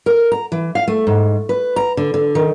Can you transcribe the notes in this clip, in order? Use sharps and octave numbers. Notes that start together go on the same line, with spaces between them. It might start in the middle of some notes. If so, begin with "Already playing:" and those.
A#4
A#5
E3
F5
A3
G#2
B4
A#5
D3
D3
D#3